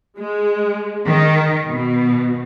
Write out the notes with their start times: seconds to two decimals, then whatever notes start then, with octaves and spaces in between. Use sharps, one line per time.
0.18 G#3
1.07 D#3
1.70 B2